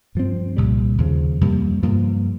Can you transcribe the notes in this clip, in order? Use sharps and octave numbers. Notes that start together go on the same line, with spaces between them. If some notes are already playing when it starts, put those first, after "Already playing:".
G2 F3 C4
C2 A#2 G3
D#2 C#3 F3
F2 C3 G3 A#3
G2 F3 A#3